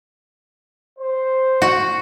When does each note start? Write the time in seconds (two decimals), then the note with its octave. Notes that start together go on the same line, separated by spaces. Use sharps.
0.98 C5
1.62 F#4